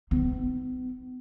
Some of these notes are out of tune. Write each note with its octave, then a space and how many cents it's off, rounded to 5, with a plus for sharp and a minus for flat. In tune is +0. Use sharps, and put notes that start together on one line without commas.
B3 +45 D#4 +0